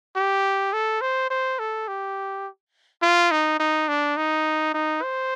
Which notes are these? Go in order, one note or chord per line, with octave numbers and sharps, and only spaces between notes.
G4
A4
C5
C5
A4
G4
F4
D#4
D#4
D4
D#4
D#4
C5